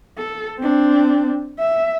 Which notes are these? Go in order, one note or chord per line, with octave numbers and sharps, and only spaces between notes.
A4
C4 D4
E5